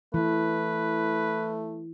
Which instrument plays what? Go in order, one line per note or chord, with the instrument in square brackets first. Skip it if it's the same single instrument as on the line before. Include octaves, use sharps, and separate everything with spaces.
[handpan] E3 [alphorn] A3 [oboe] B4